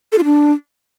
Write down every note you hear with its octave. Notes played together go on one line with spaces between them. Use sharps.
A4
F4
D4